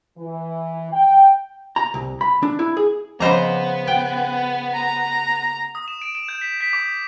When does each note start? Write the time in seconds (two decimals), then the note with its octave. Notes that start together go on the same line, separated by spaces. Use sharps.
0.18 E3
0.93 G5
1.76 A#5
1.94 C2
2.21 B5
2.43 D4
2.59 E4
2.77 G#4
3.20 C#3 F3 B3 C5 D#5 A#5 B5
3.88 G5
4.75 A#5
5.75 D#6
5.88 E7
6.02 D7
6.15 E7
6.29 G6
6.41 B6
6.61 B6
6.73 D6